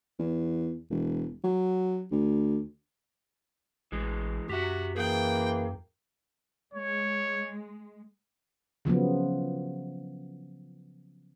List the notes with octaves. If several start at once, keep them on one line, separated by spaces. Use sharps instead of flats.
E2
E1
F#3
D2
A1 E3 G#3
F#2 F#4 G4 E5
E3 A#3 G#4 G5
G#3 C#5
C#3 F3 F#3 B3